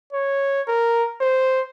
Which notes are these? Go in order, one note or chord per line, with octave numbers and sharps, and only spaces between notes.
C#5
A#4
C5